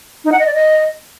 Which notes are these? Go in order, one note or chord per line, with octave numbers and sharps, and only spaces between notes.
D#4
F#5
D#5
D5
D#5